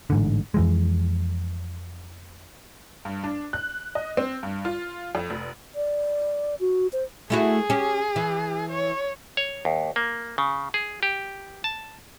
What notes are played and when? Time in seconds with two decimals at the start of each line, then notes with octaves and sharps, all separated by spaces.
0.10 A1 G#2 D3
0.54 F2 E3 G#3
3.05 G2
3.24 D4
3.53 F#6
3.95 D#5
4.17 C4
4.43 G2
4.65 F4
5.15 F2
5.30 F1
5.75 D5
6.60 F#4
6.93 C5
7.30 A3 E4 F#4 G#4
7.70 C#4 G4
8.16 E3
8.71 C#5
9.37 C#5
9.65 D#2
9.96 A#3
10.38 C#3
10.74 G#4
11.03 G4
11.64 A5